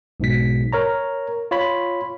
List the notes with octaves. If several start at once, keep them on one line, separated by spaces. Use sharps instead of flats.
B1 G#2 B2 B6
A#4 C#5 A#5
F4 C#5 B5